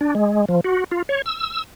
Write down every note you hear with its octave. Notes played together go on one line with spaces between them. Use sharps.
D4
G#3
F3
F#4
F4
C#5
E6